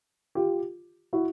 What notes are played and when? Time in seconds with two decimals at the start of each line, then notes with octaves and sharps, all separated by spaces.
0.35 F4 G4
1.13 E4 F#4